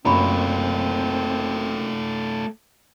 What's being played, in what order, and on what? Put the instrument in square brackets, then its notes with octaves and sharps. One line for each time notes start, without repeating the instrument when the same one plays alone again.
[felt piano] F#1 F#2 C#6 [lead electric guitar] A3 F4 [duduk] C4 [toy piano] A#5 B5